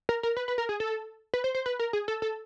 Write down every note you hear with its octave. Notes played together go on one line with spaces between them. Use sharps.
A#4
A#4
B4
B4
A#4
G#4
A4
B4
C5
C5
B4
A#4
G#4
A4
A4